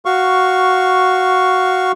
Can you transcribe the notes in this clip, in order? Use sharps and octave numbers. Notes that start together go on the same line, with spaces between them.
F#4 F5 C#6